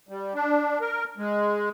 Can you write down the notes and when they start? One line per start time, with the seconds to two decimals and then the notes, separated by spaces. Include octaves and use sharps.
0.09 G3
0.34 D4
0.81 A#4
1.18 G#3